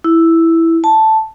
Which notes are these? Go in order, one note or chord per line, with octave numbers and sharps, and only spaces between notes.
E4
A5